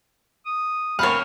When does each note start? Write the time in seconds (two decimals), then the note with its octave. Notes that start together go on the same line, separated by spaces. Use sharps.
0.46 D#6
0.99 D2 C4 A#4 C#5 F5 F#5 B5 F6